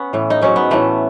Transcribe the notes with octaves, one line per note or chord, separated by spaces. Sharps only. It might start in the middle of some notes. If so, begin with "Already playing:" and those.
Already playing: B3 C#4
A2 E3
D#4
G#2 F#3 C#4
B3
A2 E3 A3